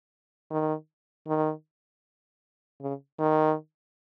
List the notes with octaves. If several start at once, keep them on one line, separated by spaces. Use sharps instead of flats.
D#3
D#3
C#3
D#3